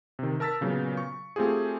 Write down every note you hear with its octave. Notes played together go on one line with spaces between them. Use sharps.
C3 D#3
A#4 A5 E6 A6 B6
A#2 C#3 F#3 B3
C#6
A3 C4 F4 G4 G#4